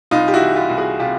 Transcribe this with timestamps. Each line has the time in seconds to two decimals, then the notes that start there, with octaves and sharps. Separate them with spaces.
0.11 C2 D#4 F4
0.28 G4
0.34 E4 F#4
0.41 E3
0.55 F4 G4
0.70 C2
0.77 F#4 G#4
0.99 C3 F4 G4